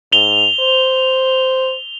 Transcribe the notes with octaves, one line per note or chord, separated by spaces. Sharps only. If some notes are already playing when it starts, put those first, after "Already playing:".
G#2 F7 G7
C5